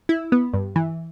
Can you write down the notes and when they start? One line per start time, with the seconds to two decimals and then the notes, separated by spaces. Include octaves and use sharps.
0.09 E4
0.32 B3
0.53 G2
0.76 E3